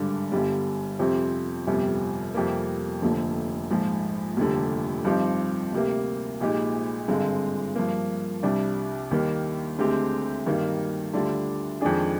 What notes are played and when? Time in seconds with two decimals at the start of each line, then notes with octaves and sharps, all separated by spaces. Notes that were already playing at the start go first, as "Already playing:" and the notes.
Already playing: G#1 G2 D3 G3 D4
0.32 G1 G2 D3 G3
0.99 F2 C3 G3 C4
1.67 G1 F2 C3 G3
2.34 F2 C3 G3 A#3
3.02 F1 D#2 D3 F3
3.70 A#1 G#2 F3
4.37 F1 D#2 D3 G3
5.05 G2 F3 C4 D#4 G4
5.72 D2 C3 G3 A#3
6.41 A#1 A#2 G#3 D#4 G4
7.08 G#1 G2 D3 G#3 C4
7.75 G2 F3 A#3
8.43 C2 C3 G3 D4
9.11 D#2 D#3 G3 A#3
9.79 D2 D3 G#3 C4 G4
10.46 G2 D#3 G3 A#3
11.14 D2 D3 G3 D4 F4
11.81 F2 D#3 G#3 D4 G#4